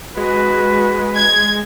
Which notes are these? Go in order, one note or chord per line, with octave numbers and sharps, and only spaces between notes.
G#3 F#4 B4
G#6